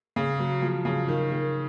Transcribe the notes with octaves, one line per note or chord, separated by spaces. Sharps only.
C#3
F#3
F3
C#3
D#3
D#3